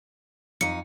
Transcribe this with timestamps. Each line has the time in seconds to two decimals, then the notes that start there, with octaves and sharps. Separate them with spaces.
0.61 F2 D#4 C#7